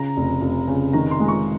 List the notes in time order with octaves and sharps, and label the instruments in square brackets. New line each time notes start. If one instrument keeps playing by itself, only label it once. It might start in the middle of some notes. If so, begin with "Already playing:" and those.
Already playing: [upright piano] C#3 A#5
F1
F1
C#3
D#3 A#5
C6
G#3
C#6